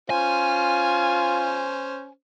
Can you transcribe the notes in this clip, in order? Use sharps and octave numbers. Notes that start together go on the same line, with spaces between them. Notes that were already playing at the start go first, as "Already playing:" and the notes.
C#4 F4 C5 G#5